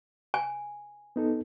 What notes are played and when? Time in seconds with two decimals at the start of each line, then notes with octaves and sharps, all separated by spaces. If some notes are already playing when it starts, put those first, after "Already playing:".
0.34 G#5
1.16 B3 D#4 A4